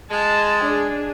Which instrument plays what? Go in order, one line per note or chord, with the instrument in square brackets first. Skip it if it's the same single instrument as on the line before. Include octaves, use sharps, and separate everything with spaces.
[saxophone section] G#3 [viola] A5
[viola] D4 G#4